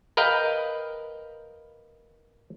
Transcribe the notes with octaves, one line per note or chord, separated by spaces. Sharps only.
A#4 B4 D#5 F5 G5